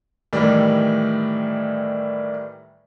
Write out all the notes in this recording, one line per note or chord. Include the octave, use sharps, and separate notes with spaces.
A2 D#3 E3 G3